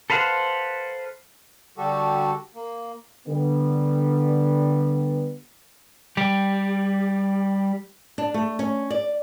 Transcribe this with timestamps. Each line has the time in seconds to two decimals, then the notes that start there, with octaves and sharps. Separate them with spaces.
0.10 A4 B4 C5 F5 F#5
1.78 D3 G3 F#4 G4 A4
2.55 A#3
3.28 D3 G3 B3
6.17 G3 G4
8.18 D4
8.34 A3
8.59 C#4
8.90 D5